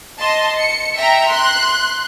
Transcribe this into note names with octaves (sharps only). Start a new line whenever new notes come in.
D#5 A5 C6
C#7
E5 G5 A#5
C6 F#6